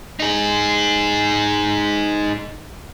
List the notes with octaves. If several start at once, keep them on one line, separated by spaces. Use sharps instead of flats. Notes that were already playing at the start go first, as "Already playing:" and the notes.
D#4 G#4